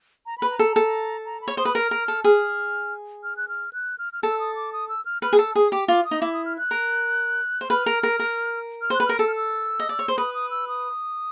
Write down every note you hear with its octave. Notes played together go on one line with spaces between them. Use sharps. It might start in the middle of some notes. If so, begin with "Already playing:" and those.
A#5
B4 B5
A#5
A4
A4
A#5
B5
C#5
C5 D#6
B4
A#4 F6
A#4
A4
G#4 F6
F6
F#6
F6
F#6
F6
F6
A4 E6
D#6
D6
D#6
E6
F6
B4 F6
G#4
A4 E6
G#4 D#6
G4 D6
F4 D6
D#6
D#4
E4 D6
D#6
F6
F#6
A#4
C5
B4 F6
A#4
A#4
A#4
F6
C5
F#6
B4
A#4 F6
A4 E6
F6
E6
D#5
D5
C#5
C5
B4 D#6
D#6
E6
D#6